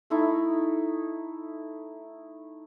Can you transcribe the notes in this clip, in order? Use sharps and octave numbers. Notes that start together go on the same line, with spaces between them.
A3 D#4 E4